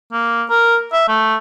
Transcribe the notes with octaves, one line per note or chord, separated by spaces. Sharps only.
A#3
A#4
E5
A3